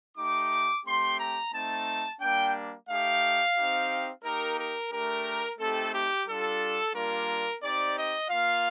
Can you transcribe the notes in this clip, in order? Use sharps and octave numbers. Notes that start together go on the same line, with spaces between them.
A3 D#4 G4 D6
A3 C4 G4 C6
A#5
A3 C4 D#4 A5
G3 A#3 D4 G5
A3 D#4 G4 F5
C4 D#4 G4
A#3 D#4 G4 A#4
A#4
A3 D4 G4 A#4
A3 C4 D#4 G4 A4
G4
G3 D4 F4 A4
G3 A#3 D4 F4 A#4
C4 D#4 G4 D5
D#5
A#3 F4 F5